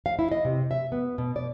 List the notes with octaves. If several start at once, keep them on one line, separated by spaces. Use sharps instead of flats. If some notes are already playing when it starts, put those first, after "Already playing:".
F5
E4
D#5
C3
E5
B3
B2
D5